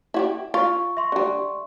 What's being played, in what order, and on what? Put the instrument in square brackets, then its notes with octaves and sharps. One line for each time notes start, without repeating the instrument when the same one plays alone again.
[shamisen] E4 F#4 G4
[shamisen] F4 [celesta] C#6
[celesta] E5 C6 C#6
[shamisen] D3 G3